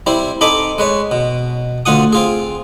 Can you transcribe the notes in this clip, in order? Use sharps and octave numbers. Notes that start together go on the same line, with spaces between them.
G3 C4 E4 C5
C4 D#4 A4 G#5 B5 D6
G#3 B4 C#5
B2
D2 F4 F#5 G#5 D#6
C4 F4 G#4